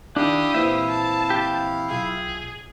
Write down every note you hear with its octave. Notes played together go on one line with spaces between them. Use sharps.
D#3 D4 E4 G4 F5 D#6
A#2 E3 C4 E5
A5
G4
B1 F4 G#4 E5